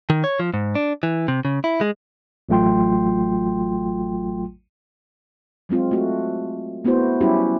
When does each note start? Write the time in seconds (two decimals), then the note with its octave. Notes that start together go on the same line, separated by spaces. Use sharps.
0.10 D#3
0.24 C#5
0.40 F3
0.54 G#2
0.75 D4
1.03 E3
1.28 C3
1.45 C#3
1.64 E4
1.81 G#3
2.49 A1 F#3 A3 F4 G5 C6
5.69 F#3 G#3 C4 F4
5.91 A3 F#4
6.85 A3 B3 E4 F#4 C5
7.21 F#3 G3 C#4 E4 F#4 G4